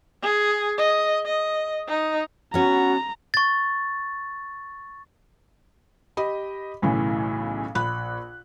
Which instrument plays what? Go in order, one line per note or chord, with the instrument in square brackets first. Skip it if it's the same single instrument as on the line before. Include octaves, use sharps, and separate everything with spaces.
[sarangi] G#4
D#5
D#5
D#4
[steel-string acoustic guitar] B3 C#4 [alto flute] F#4 [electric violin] A#5
[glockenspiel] C#6 A6
[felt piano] G4 D#5 B5
B1 A2 C#3 E3
A#1 B5 F#6